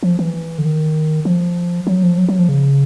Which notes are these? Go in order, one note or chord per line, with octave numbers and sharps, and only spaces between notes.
F3
E3
D3
D#3
F3
F#3
F3
F#3
F#3
F3
C#3